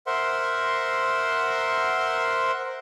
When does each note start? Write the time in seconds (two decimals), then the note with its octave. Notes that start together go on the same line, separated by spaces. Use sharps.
0.07 A#4 C5 E5 F#5 C6